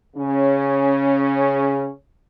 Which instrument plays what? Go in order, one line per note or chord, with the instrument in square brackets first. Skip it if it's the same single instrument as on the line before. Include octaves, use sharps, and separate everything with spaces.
[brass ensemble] C#3 C#4